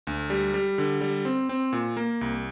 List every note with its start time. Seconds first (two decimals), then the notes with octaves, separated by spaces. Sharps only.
0.07 D2
0.30 G3
0.54 G3
0.78 D3
1.01 G3
1.25 C4
1.49 C4
1.73 A#2
1.97 A#3
2.21 C2